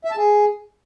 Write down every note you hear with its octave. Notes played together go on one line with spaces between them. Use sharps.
E5
A5
G#4